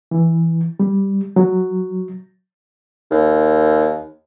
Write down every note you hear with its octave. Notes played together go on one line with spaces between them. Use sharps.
E3
G3
F#3
D#2